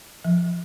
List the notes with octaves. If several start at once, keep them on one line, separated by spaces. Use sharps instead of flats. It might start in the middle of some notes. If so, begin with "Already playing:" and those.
F3